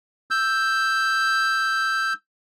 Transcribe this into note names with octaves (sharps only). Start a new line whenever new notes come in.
E6 G6